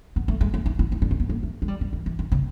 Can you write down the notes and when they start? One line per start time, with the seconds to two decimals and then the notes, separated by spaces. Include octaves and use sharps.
0.16 B3
0.28 A3
0.41 G#3
0.54 A#3
0.66 D#4
0.79 E4
0.92 D#4
1.02 D4
1.11 C#4
1.20 B3
1.29 A#3
1.43 A3
1.62 G#3
1.68 G3
1.81 F3
1.93 E3
2.06 E3
2.19 D#3
2.32 C#3